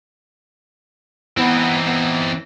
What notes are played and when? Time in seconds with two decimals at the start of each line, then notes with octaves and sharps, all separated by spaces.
1.37 E3 B3 C4 D#4
1.85 B3